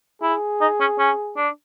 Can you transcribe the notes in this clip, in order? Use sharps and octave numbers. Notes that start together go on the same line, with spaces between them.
E4 G#4
D#4
C#4
C#4
D4